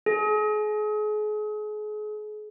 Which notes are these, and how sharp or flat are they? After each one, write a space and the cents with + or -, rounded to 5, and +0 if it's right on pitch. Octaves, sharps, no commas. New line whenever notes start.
G#4 +35